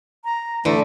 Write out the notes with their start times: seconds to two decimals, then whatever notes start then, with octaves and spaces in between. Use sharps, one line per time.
0.24 A#5
0.65 D3 E3 A3 D5